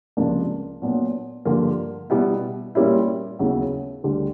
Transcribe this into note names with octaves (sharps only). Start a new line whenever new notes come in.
C#2 C3 F3 A#3 D4
A#2 F#3 B3 D4
G2 D3 F3 A#3
B2 G3 B3 E4
A#2 G3 A#3 C#4 E4
D#2 C#3 F#3 B3 E4
D2 D3 G3